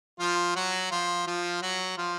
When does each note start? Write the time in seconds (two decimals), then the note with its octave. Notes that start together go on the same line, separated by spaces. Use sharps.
0.20 F3 F4
0.56 F#3 F#4
0.92 F3 F4
1.27 F3 F4
1.62 F#3 F#4
1.98 F3 F4